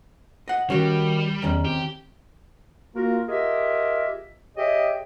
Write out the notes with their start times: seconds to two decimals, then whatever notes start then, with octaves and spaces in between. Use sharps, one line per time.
0.48 D#5 F#5
0.70 D#3 G3 C#4 F#4
1.42 E2 D#3 C#4
1.65 C4 G4
2.96 A#3 F4 F#4 A#4
3.28 F4 G4 G#4 A#4 D#5 E5
4.57 G4 G#4 C#5 D#5 E5 G5